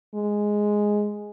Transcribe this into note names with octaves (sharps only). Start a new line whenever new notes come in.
G#3